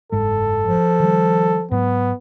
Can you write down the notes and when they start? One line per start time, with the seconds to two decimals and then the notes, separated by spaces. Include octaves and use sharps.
0.12 F#1 G#2 G#3 A4
0.64 F3
1.00 D#3 G3
1.71 G#2 F#3 B3